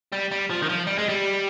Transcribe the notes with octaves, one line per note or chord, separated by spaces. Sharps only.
G3
G3
F3
D#3
F3
G3
G#3
G3